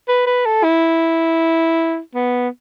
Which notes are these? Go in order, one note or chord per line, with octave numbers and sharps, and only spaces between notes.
B4
B4
A4
E4
B3